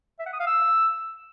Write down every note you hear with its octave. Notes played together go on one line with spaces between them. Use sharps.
E5
F#5
D#6
F5
E6